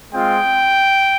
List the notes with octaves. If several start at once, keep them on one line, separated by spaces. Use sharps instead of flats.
G#3 C4 F4 G5